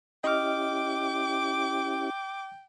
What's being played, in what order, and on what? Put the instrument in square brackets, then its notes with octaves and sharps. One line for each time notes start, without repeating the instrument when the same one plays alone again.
[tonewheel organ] C#4 E4 G4 [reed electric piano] D#5 F6 [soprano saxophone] G5 [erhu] D6